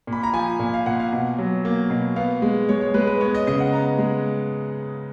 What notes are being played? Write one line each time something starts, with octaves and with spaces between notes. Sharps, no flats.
A#2
B5
A#5
F3 G#5
A#2
F5
A#2 F#5
F5
B2
F#3
A#3
B2
B3 F5
G#3
G#3 C#5
C#5
G#3 B4
B4
B3 C#5
D#5
C#3 D#5
F#5
B3 A#5
G#3